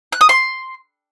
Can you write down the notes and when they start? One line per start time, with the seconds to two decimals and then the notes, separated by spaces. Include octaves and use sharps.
0.12 F#6
0.21 D#6
0.29 C6